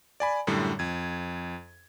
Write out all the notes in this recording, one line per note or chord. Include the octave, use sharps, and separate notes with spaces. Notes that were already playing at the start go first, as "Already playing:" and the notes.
D5 G#5 B5
F#2 A2 D3 G3
F2 G#6